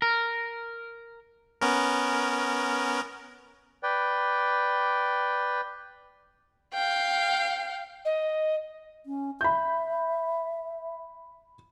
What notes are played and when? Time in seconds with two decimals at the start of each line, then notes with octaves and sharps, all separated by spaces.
0.02 A#4
1.61 B3 C#4 A#4
3.83 B4 D5 G5
6.74 F5 G5
8.05 D#5
9.06 C#4
9.41 E5 B5 G6